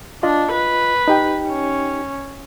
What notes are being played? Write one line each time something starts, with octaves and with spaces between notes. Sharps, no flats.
D4 F4 D#5
B4
D#4 G4 G5
C#4